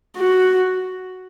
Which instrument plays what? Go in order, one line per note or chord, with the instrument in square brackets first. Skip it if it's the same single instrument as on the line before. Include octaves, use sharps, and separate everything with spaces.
[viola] F#4